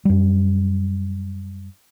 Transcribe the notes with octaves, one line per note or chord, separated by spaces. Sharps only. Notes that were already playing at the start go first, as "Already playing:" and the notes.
F#2 G3